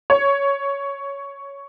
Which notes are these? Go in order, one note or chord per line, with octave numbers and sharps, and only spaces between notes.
C#5